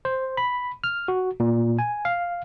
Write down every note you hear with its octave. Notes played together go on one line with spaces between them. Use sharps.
C5
B5
F6
F#4
A#2
G#5
F5